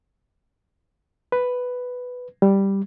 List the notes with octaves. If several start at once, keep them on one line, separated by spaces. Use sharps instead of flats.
B4
G3